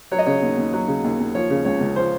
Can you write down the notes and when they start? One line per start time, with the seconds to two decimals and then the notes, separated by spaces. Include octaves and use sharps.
0.11 F#3 C#5
0.18 D#5
0.26 C#3 C#5
0.42 D#2
0.58 D#2
0.73 F#3
0.88 C#3
1.04 D#2
1.20 D#2
1.35 F3 C#5
1.50 C#3
1.65 C#2 C#5
1.80 C#2
1.96 F3 C5